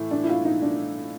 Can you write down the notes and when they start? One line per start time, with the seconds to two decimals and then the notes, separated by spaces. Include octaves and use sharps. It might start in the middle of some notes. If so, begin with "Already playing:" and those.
Already playing: A2 E3 A3
0.11 D4
0.23 E4
0.29 F4
0.45 D#4
0.62 D4